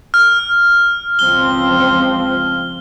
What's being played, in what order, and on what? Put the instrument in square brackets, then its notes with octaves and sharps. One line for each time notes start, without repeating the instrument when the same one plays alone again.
[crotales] F6
[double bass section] C#2 F3 C4 [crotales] G7